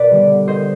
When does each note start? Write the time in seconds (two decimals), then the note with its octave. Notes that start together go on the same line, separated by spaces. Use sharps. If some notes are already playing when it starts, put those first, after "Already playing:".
Already playing: B2 B4 D5
0.11 D3 G3 B3 D4
0.48 C5 D#5